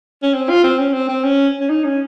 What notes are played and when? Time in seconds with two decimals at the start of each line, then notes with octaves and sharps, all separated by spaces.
0.23 C#4
0.34 C4
0.49 F4
0.64 C4
0.79 C#4
0.94 C4
1.09 C4
1.24 C#4
1.60 C#4
1.70 D#4
1.85 C#4